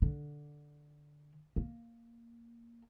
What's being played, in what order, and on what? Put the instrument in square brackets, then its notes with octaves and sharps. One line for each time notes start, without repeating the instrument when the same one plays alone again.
[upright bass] D3
A#3